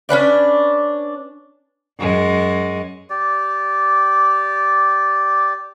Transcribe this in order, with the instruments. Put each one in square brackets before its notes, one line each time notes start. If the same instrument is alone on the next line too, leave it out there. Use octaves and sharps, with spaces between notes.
[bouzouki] C#4 D4 B4 D5
[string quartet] F#2 G#3
[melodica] G4 D5